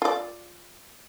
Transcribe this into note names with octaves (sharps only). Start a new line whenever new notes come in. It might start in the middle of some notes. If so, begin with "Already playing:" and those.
F4 D5